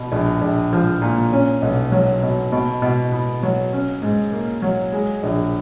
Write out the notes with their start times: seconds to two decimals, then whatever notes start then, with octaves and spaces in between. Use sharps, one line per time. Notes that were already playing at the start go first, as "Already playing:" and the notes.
Already playing: B2
0.12 A#1
0.42 A#1
0.73 F3
1.02 A#2
1.32 C#4
1.62 B1
1.92 F#3
2.22 B2
2.52 B2
2.82 B2
3.12 B3
3.43 F#3
3.73 C#4
4.02 G#2
4.32 A#3
4.62 F#3
4.92 G#3
5.23 A#1